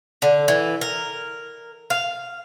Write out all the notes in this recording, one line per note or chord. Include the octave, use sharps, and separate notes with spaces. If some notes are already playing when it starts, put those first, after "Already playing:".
D3
E3
A#4
F5